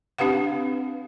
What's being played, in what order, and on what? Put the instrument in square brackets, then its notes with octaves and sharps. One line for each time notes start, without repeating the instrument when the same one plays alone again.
[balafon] C4 D4 G4 B4 F5 F#5